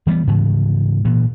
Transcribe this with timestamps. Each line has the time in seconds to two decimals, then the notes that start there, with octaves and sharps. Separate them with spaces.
0.07 E3 G3 A#3 B3
0.27 G#2 C#3 E3
1.05 A#2 E3